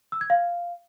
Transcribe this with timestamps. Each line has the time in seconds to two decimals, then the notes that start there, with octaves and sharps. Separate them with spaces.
0.12 E6
0.21 G#6
0.30 F5